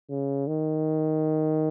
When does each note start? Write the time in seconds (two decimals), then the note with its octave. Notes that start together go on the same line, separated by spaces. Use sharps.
0.09 C#3
0.47 D#3